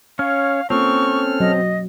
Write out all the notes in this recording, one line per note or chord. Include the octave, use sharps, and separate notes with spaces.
C#4 C#5 F5
A#3 C4 C#4 F4 A4 C#6 F6
F#3 D#5